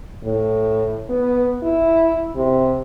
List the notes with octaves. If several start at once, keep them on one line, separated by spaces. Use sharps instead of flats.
A2
B3
E4
C3